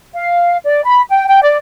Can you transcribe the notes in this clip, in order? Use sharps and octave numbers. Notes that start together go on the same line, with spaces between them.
F5
D5
B5
G5
G5
D5